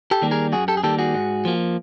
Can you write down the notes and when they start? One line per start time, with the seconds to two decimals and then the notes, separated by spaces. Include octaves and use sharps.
0.11 G4 A4
0.22 D#3 G3 A#3
0.31 G#4 A#4
0.52 F#2 F#4 G#4
0.68 G4 A4
0.77 G#4
0.84 D#3 G3 A#3 G4 A4
0.99 F#4 G#4
1.14 G#2
1.45 F3 A#3